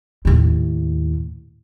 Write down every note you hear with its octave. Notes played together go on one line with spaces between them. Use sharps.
D#2 A2